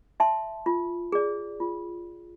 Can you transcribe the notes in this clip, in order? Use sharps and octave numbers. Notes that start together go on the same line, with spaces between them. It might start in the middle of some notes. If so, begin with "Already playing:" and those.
E5 A5 C6
F4
G#4 D5
F4